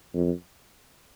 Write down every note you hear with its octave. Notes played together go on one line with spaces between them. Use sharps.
F2